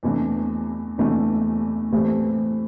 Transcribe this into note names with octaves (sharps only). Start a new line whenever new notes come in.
E2 C3 E3 A3 D4
E2 C3 E3 A3 D4
A2 E3 A3 C4 G4